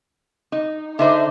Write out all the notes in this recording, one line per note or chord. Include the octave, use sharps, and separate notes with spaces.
D#4
D3 D#4 C5 E5